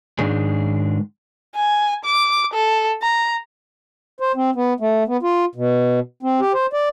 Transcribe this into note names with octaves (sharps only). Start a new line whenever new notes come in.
G#2 D#3 G#3 D4 G#4
G#5
D6
A4
A#5
C5
C4
B3
A3
B3
F4
B2
C4
G4
C5
D5